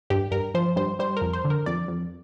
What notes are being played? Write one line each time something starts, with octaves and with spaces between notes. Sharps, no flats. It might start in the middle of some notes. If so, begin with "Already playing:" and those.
G2 G4
G2 A#4
F3 C5
G2 C5
G3 C5
F2 A#4
C5
D3
A#4
F2 D5
F2